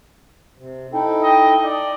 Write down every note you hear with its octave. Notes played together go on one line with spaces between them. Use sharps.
C3
D#4 E4 A4 G5
D#5
D5